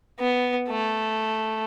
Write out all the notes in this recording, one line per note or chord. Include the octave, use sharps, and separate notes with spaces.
B3
A3